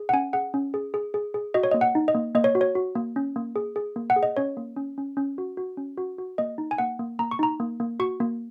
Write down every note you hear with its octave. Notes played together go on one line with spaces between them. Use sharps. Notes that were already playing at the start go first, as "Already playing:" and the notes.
Already playing: G#4
F#5
C#4 G#5
G#4 F#5
C#4
G#4
G#4
G#4
G#4
F#4 D#5
C#5
D#5
A#3
F#5
D#4
D#5
A#3
A#3 D#5
C#5
F#4
C#5
F#4
A#3
C#4
A#3
G#4
G#4
A#3
F#5
G#4
D#5
C#4 C#5
A#3
C#4
C#4
C#4
F#4
F#4
C#4
F#4
F#4
A#3 D#5
D#4
G#5
A#3 F#5
A#3
A#3 A#5
C#6
D#4 A#5
A#3
A#3
F#4 C#6
A#3